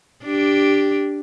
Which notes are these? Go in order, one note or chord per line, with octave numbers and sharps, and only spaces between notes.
D4 G4